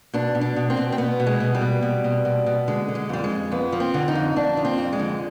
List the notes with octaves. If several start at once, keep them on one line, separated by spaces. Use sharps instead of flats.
B2 D4
B2
D4
B2
C4
B2
C4
B2 B3
B2
G#3
B2
G3
B2
B2
B2
B2
B2
D3 G#3
D3
G#3
F2 G3
G#3
F2
F2 B3
F3
C4
D3
D#4
F2
F2 D4
F3
C4
F2
G#3
D3